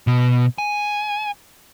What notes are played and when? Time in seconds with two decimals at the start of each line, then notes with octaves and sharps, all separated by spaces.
0.07 B2
0.58 G#5